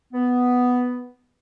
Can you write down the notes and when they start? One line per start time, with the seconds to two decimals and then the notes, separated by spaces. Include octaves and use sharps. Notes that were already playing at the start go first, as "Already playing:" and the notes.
0.13 B3